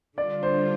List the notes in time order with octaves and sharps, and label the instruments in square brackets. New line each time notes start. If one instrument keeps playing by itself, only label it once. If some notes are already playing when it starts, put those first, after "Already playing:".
[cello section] D3 G3 D4 F4 [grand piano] D5
[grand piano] C5